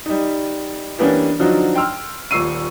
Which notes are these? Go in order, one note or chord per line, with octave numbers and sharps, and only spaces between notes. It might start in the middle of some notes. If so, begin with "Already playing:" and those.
G3 D#4
E3 G3 A#3 B3 C#4 D4
D3 F3 F#3 D4 D#4 F#4
G5 C6 E6 F6
D#1 A#2 C#6 E6 C7 D#7